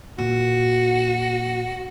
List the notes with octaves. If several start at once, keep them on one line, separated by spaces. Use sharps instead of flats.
A#2 F#4